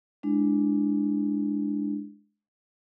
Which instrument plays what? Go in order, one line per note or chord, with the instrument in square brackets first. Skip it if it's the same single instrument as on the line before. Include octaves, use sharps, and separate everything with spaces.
[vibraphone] G#3 D4 E4